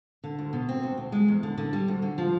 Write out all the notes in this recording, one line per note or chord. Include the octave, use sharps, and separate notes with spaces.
D3
D2
B2
C4
D2
D2
G#3
E2
D3
D3
G3
D2
D3
F3